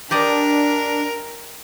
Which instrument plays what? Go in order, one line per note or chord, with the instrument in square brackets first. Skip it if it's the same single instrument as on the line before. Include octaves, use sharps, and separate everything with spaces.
[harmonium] D4 [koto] G4 D5 D#5 [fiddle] A#4